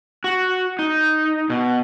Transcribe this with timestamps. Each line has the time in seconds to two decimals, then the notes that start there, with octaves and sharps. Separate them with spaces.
0.24 F#4
0.79 D#4
1.50 B2